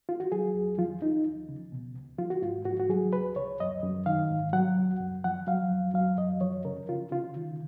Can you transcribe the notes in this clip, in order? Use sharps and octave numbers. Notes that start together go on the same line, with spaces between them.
F4
F#4
F#3 G#4
F2
F3 F4
F3 D#4
D#2
C#3
B2
C#2
F3 F4
F#4
G#2 F4
G#2 F#4
F#4
F#3 G#4
C#2 B4
C#2 C#5
F#2 D#5
F#2
D#3 F5
G#2
F#3 F#5
C#2
F#2
F3 F#5
F#3 F5
F2
F#3 F5
F#2 D#5
F3 C#5
C#3 A#4
C#3 F4
C#3 F4
D#3